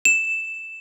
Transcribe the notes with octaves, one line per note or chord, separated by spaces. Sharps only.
E7